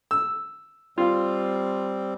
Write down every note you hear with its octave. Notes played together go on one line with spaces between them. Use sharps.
E6
G3 C4 F4